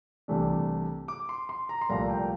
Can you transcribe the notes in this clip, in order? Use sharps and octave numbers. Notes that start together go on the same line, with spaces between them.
C2 C3 E3 A3 D4
D6
C6
C6
A#5
C6
C2 A#2 F3 A3 A#5
G5